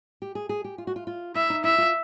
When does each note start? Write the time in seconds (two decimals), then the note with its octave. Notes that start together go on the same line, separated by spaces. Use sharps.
0.22 G4
0.35 G#4
0.49 G#4
0.64 G4
0.78 F4
0.87 F#4
0.96 F4
1.07 F4
1.35 E4 E5
1.50 D#4
1.64 E4 E5
1.78 F4